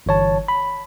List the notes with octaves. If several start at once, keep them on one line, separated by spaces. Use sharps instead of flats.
G1 E3 C#5 A5
B5